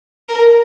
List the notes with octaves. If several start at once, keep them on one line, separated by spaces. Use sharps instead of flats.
A#4